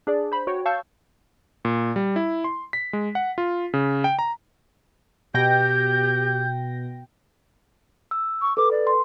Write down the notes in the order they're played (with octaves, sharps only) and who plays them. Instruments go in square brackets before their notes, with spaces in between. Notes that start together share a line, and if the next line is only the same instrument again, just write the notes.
[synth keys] D4 G#4 D5
C5 B5
F#4 C#5 G5
F5 A5 C#6 E6 G6
[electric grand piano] A#2
G3
E4
C6
B6
G#3
F#5
F4
C#3
G5
A#5
[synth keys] B2 G5 A#6 [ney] G4 [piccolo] G6
[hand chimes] E6
[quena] C#6
[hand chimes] A4 B4 [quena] D6
[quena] D5
[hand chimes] C6